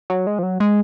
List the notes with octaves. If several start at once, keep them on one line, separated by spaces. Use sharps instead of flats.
F#3
G#3
F3
F#3
G#3